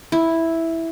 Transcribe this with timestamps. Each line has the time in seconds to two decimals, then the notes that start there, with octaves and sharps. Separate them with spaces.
0.12 E4